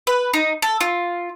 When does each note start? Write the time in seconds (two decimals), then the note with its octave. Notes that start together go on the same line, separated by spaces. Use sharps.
0.07 B4
0.33 D#4
0.62 A4
0.81 F4